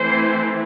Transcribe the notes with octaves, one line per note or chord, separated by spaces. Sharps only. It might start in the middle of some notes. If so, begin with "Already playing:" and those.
Already playing: E3 A3 C4 E4 C5